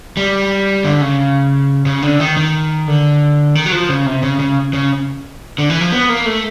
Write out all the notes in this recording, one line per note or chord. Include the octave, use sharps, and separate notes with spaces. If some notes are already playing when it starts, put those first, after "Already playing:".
G3
D3
C#3
C#3
D3
D#3
D#3
D3
D#3
F#3
F3
C#3
C3
C#3
C#3
C#3
D3
E3
F3
B3
A#3
A3